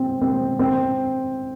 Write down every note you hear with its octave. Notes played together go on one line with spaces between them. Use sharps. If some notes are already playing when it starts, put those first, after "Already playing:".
Already playing: C4
C4
C4